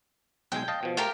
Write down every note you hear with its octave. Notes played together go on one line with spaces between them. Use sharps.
B1 G#3 G5 G#5
D#5 F5 A5
B2 F3
A3 F4 G4 A#4